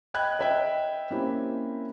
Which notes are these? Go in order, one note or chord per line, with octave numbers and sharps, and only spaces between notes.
D#5 G5 B5 F#6 G#6
D#5 E5 G5
A#3 C4 C#4 E4 G4